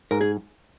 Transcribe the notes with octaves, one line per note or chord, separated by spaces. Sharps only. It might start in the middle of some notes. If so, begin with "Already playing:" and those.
G#2 A#4
G#4